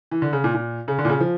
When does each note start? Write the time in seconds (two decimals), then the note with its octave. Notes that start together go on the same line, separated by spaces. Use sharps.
0.11 E3
0.22 D3
0.33 C#3
0.44 A#2
0.54 A#2
0.88 C#3
0.98 D3
1.05 A#2
1.09 C#3
1.20 F3